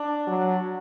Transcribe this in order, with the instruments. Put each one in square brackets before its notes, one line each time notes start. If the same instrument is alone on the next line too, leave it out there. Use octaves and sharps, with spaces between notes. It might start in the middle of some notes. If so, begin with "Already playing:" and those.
Already playing: [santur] D4
[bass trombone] F#3